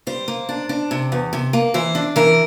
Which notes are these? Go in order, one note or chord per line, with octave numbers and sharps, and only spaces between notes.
G3 C5
A#3
D4
D4
C3
E2
C3
A#3
E3 C5
D4
E3 A#4